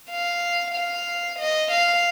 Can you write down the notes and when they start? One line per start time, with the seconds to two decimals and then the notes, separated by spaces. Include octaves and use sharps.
0.11 F5
0.74 F5
1.39 D#5
1.72 F5